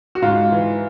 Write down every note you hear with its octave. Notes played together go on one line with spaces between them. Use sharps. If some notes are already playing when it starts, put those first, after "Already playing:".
F#4
G#2 F4
E3